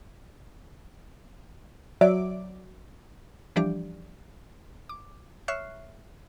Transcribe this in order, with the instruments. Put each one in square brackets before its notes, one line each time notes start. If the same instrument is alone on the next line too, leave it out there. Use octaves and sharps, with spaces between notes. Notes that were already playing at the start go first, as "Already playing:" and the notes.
[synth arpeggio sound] F#3 [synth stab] D5 E5 D6
[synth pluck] E3 F3 G3 D4 G4 D5
D6
C#5 E5 C#6 F6 F#6 C7